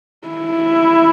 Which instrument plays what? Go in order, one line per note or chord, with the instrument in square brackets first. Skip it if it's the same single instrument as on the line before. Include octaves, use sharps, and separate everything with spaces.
[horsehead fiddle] E4